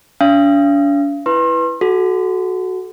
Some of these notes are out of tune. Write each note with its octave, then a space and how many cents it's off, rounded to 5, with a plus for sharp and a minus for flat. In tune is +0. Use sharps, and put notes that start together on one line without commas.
D4 -45 F5 -35
E4 +0 B4 +0 C6 +40
F#4 +0 A4 -30